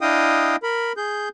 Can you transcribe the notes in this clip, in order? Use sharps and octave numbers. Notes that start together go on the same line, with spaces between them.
D4 E4 D#5 F5 G5 D#6
A#4 B5
G#4 G6